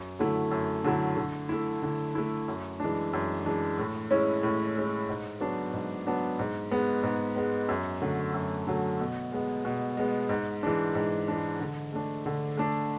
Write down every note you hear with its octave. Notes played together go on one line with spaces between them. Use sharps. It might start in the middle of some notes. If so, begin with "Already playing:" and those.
Already playing: F#2
D3 F#3 A3 E4
F#2
D3 F#3 A3 E4
D3
A3 E4
D3
A3 E4
F#2
E3 G#3 D4
F#2
E3 G#3 D4
A2
G#3 C#4 E4
A2
G#3 C#4 E4
G#2
F#3 B3 D4
G#2
F#3 B3 D4
G#2
G#3 B3
G#2
G#3 B3
F#2
D3 F#3 A3
F#2
D3 F#3 A3
B2
G#3 B3
B2
G#3 B3
G#2
E3 G#3 D4
G#2
E3 G#3 D4
D3
A3 D4
D3
A3 D4